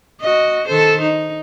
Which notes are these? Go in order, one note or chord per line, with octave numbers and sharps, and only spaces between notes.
F#4 D#5
D#3 A4 C5
D#4